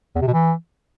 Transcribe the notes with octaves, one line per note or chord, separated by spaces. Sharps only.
E2
C3
B2
E3